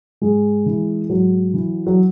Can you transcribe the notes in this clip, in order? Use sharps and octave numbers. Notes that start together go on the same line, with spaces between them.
G#2 G#3
E3
G#2 F#3
E3
F#3